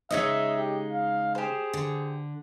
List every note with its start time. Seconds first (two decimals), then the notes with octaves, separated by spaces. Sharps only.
0.11 C#3 G#3 D#4 C#5 D#5 E5
0.57 G4
0.90 F5
1.35 G4 G#4 C5
1.73 D3